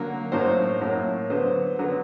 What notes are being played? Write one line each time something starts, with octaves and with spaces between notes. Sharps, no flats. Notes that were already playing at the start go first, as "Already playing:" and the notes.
Already playing: D3 F#3 A#3
A2 F#3 A#3 C5
A2 F#3 A#3
D3 F#3 B3 C5
D3 F#3 B3